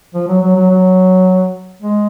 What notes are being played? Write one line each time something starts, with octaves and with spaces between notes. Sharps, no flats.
F3
F#3
F#3
F#3
F#3
G#3